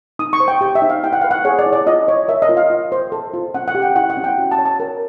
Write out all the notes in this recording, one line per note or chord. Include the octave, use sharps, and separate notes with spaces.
D#4 D#6
C#6
C5
G5
G4 G5
E5
D#4
F5
E4 G5
F#5
B4 F5
F#5
G#4 C#5
D5
E4
D5
F4 D#5
C#5
A#4 E5
D#5
F4
F5
F4
C5
A4
F4
C#4 F#5
F#5
G4
G5
E4 F#5
F#5
C#4
G5
F#4
A5
C#5
A5
A#4